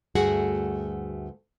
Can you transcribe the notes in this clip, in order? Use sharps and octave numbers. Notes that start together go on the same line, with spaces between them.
D2 G2 A3 F#4 G#4 F#5